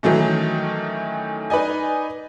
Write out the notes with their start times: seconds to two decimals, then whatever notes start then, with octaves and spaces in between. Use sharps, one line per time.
0.03 D#3 E3 F#3 A3 C#4
1.50 D#4 B4 D5 D#5 G#5